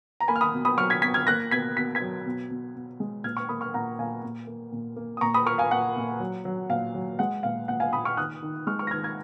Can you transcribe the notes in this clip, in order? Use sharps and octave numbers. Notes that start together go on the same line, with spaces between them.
A#5
A#3 G#5 B5
F6
B5 D#6
B2
B5 D#6
F#3 C#6 F6
G#6 B6
B2 G#6 B6
F6 G#6
A#3 F#6 A#6
B2 G#6 B6
B2 B6
G#6 B6
F#3
B2
B2
B2
G#3
A#2 F6 G#6
C#6 F6
A#3 B5 D#6
C#6 F6
A#2 F#5 A#5
A#2 F5 G#5
A#2
A#3
A#2
A#3
D#6
A#2 A#5 C#6
B5 D#6
A#3 C#6 F6
F5 G#5
A#2 F#5
A#2
F#3
F#3
A#2 F5
F#3
G#3 F#5
A#2 F5
A#2 F#5
F5 G#5
A#2 B5 D#6
C#6 F6
D#3 D#6 F#6
D#3
G#3 C#6 F6
C#6 F6
A#6
D#3 F6 G#6
F6 G#6